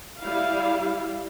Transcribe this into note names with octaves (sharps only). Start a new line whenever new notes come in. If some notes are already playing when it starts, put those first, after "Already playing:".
G3 E4 F5